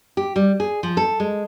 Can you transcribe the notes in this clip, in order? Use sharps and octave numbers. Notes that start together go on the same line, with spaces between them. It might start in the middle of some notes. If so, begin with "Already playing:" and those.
G4
G3
G#4
F3
A4
G#3